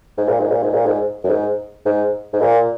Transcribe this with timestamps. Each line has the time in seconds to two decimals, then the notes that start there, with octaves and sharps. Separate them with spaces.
0.17 G#2
0.28 A#2
0.40 G#2
0.51 A#2
0.63 G#2
0.74 A#2
0.86 G#2
1.24 F#2
1.29 G#2
1.86 G#2
2.33 G#2
2.42 A#2